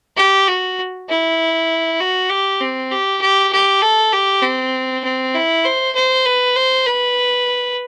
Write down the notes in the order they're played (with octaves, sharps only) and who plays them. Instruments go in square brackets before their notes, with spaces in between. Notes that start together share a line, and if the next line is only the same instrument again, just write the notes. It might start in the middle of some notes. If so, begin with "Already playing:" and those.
[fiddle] G4
F#4
E4
F#4
G4
C4
G4
G4
G4
A4
G4
C4
C4
E4
C5
C5
B4
C5
B4